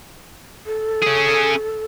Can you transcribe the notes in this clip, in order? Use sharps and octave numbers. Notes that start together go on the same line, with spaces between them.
A4
C#4 G#4